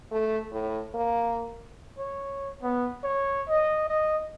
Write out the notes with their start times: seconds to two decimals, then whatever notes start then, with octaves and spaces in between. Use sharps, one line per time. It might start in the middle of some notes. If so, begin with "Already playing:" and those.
0.11 A3
0.52 A2
0.94 A#3
1.99 C#5
2.63 B3
3.03 C#5
3.48 D#5
3.88 D#5